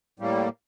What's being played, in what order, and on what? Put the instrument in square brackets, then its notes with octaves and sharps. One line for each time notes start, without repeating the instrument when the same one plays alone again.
[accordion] A2 G3 A#3